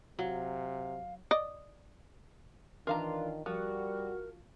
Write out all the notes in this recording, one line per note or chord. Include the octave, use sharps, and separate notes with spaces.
C3 F#3 F5
D5 D#5
D#3 E3 D4 F4 A#4 F5 A#5
F3 G3 F#4 A#4